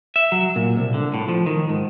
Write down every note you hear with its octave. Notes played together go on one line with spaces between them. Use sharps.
E5
F#3
A#2
C2
D3
A2
F3
D#3
G#2